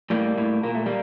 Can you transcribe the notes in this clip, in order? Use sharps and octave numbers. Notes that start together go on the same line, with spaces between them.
A2 G3 A#3
A2
A#2 A#3
A3
G3 A#3